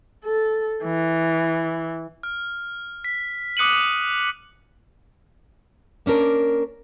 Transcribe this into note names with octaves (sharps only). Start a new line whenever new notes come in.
A4
E3
F6
B6
D6 D#6 F#6 C#7 D#7 F#7
A#3 C#4 D4 A#4